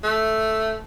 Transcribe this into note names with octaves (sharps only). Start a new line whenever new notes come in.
A3